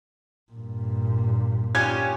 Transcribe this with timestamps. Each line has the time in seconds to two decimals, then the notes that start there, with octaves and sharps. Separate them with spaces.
0.52 G2 A#2
1.75 C#4 F4 G4 G#6